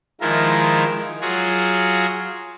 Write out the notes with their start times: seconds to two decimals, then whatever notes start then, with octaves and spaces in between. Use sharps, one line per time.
0.21 D#3 F3 G#3 E4 F4 A#4
1.21 F#3 F4 F#4 G#4